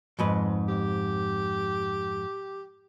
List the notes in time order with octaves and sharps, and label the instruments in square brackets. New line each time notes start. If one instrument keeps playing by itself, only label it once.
[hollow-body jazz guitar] F2 G#2 B4
[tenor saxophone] G4